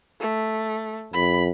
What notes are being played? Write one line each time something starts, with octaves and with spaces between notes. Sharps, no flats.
A3
F2 B5